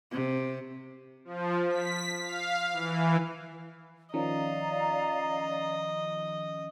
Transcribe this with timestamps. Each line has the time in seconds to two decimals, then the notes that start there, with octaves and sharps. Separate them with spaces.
0.12 C3
1.25 F3
1.69 B6
2.23 F5
2.73 E3
4.14 D#3 F3 C#4 D5 D#5 F5 A#5